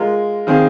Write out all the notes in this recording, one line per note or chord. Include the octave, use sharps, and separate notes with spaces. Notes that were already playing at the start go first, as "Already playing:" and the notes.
Already playing: G#3 F4 A#4
D#3 C4 G#4 F5